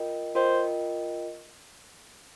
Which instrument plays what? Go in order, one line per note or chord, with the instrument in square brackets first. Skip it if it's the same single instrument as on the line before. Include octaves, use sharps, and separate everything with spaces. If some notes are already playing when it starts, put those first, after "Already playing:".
Already playing: [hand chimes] F4 A#4 D#5 G5
[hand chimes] F4 A#4 D#5 G5 [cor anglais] C5